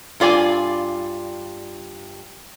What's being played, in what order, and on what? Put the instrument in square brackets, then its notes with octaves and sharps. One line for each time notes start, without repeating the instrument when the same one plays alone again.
[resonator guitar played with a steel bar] G2 F4 D5 G#5